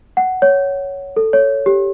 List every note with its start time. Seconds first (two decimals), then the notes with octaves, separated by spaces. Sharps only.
0.17 F#5
0.42 C#5
1.16 A4
1.33 C#5
1.66 G4